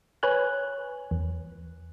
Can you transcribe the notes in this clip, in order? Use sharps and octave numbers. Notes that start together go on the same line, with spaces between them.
B4 C#5 G#5 F#6
E2